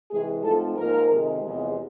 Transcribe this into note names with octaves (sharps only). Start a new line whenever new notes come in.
C3 E3 G#3 G#4
G#2 F3 A3 C4 A4
G#2 F3 A#3 A#4
F2 C3 D#3 G#3
E2 C3 F3 G#3